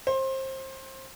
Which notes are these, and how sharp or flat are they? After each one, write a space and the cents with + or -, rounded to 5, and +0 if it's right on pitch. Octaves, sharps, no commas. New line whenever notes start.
C5 +25